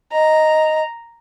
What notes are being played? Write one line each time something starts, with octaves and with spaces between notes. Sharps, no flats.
D#5 A#5